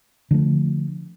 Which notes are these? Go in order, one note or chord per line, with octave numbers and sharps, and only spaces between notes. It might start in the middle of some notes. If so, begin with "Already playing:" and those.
D3 F3 A3